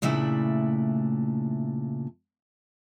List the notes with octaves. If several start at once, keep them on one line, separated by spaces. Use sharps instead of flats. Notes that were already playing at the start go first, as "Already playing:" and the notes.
A#2 C#3 A3 D4 E4 E5